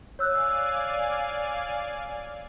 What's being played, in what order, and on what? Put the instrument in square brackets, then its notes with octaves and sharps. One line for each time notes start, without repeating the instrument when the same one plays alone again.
[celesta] C#5 E6 F#6 [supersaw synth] D5 F5 G#5